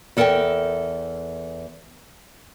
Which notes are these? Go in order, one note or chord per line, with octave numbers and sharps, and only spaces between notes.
E2 A4 A#4 D#5 E5 G5